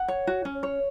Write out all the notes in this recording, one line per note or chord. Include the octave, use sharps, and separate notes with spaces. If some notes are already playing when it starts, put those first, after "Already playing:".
Already playing: F#5
C#5
F#4
C#4
C#5